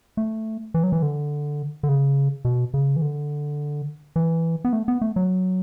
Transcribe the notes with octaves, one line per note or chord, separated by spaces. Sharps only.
A3
E3
F#3
E3
D3
D3
C#3
B2
C#3
E3
D3
E3
B3
A3
B3
A3
F#3